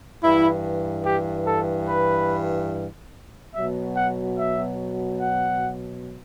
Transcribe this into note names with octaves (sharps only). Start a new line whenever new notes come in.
G2 E3 E4
G4
A4
B4
B2 F#3 E5
F#5
E5
F#5